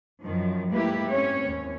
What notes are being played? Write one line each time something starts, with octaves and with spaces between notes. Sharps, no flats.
F#2 D#3 F3
G#2 A3 A#3 E4 G4 B4
C4 C#4 C#5
D#2